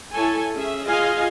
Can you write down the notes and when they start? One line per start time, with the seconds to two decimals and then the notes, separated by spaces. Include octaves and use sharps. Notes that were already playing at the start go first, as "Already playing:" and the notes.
0.14 E4 A4 C#5 G#5
0.54 C#4 G#4 E5
0.88 F4 G#4 D#5 F5 G#5